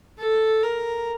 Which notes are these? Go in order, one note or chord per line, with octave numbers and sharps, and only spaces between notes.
A4
A#4